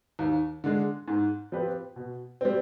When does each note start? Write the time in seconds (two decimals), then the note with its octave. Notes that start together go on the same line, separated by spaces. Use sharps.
0.19 D#2
0.64 D3 G#3
1.08 G#2
1.52 F3 C4 G4 B4
1.96 B2
2.41 G3 C4